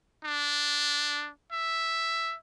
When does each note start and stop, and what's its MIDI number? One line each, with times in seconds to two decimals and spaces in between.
0.24 1.30 62
1.52 2.35 76